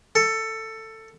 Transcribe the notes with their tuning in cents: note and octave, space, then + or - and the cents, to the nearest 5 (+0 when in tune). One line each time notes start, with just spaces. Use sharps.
A4 +15